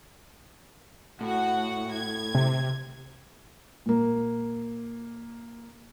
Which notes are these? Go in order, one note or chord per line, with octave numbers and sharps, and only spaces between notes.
A2 F#4 F#5
G#6
C3
A#2 A#3